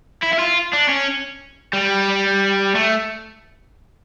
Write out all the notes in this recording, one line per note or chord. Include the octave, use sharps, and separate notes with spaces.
E4
E4
F4
D4
C#4
G3
A3